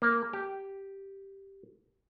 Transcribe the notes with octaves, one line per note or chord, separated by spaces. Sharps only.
A#3
G4